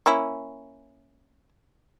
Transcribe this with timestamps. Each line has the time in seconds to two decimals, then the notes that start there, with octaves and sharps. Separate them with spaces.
0.06 A#3 C#4 E4